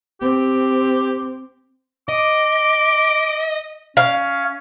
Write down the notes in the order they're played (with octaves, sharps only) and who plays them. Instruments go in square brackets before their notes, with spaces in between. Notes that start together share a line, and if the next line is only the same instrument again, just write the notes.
[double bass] C4 [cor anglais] G4
[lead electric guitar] D#5 [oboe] D6
[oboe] C#4 [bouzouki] F5